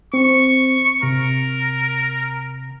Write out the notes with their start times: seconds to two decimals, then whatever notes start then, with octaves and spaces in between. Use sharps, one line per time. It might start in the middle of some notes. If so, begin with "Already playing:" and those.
0.14 C4 C#6
1.03 C3 A#4